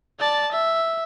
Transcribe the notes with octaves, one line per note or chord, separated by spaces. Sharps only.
D5 A5
E5